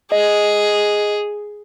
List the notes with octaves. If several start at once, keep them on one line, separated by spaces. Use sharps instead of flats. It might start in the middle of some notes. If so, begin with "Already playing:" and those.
G#4 D#5